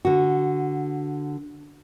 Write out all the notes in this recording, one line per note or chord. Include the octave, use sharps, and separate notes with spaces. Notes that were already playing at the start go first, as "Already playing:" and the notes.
D3 F#4